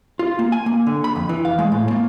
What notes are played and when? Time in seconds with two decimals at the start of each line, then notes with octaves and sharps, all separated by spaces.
0.19 F4
0.39 A#3
0.52 G#5
0.66 A#3
0.86 D3
1.04 B5
1.16 F2
1.29 E3
1.45 F5
1.59 G#3
1.72 A2
1.91 A#3